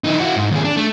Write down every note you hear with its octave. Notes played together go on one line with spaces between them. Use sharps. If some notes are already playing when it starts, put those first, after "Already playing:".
E3 D#4
E4 F#4
G#2
D#2 G#4
D4
A3